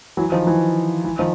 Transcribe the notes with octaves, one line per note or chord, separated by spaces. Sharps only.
E3 F#3
D#3 F3
E3
E3
D#3 F3